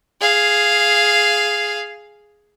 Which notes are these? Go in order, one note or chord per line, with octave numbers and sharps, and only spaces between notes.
G#4 F5